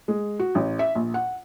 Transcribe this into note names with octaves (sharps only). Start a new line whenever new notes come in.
G#3
F#4
A1
E5
A#1
F#5